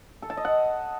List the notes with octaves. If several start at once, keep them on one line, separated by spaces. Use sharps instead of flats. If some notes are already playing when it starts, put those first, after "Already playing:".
A4
A5
D#5
F#5